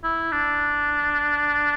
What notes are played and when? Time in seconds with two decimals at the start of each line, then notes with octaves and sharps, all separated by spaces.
0.03 E4
0.32 D4